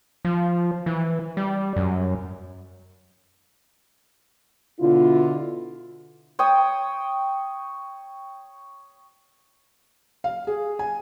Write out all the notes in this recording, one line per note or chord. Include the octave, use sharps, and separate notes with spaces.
F3
E3
G3
F#2
B2 D3 E4 F4
C#5 G5 C#6 D#6
F5
G#4
G#5